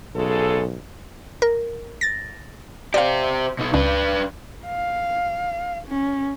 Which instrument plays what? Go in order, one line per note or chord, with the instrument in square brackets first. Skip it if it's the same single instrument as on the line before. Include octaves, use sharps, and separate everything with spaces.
[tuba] B1 [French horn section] C#3 G#3 A4
[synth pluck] A#4
A6 A#6
[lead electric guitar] G4 C5 [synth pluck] D5 F5
[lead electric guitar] B2 D#4
[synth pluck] C#2 [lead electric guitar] D4 B4
[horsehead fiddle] F5
C#4